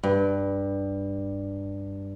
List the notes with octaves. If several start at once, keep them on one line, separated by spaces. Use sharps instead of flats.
G2